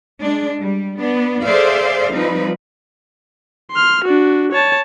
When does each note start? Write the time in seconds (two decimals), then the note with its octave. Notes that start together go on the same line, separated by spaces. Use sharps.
0.20 G#3 D4
0.60 G3
0.98 B3 D4
1.44 G#4 A4 C5 D5 E5 F5
2.11 F3 G3 C4 D#4 B4
3.72 C6 F6
4.04 D4 F#4
4.52 C#5 A5